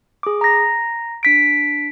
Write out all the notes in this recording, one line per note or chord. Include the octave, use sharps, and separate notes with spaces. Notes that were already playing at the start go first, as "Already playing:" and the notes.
G#4 D6
A#5 A#6
D4 B6 D7